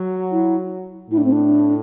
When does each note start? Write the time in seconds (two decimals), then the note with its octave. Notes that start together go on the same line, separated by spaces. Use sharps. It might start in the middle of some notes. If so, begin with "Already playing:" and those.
Already playing: F#3
0.32 E4
1.11 A2 E4
1.18 D4
1.25 C4
1.32 D4